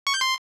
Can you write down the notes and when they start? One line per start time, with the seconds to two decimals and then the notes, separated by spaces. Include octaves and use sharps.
0.07 C#6
0.14 G6
0.21 C6